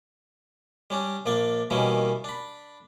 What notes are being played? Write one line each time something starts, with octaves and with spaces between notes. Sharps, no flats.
G3 C#4 D4
A#1 A#3 D4 D5
B2 D#3 E3 G3 A#3 C#4
D4 B5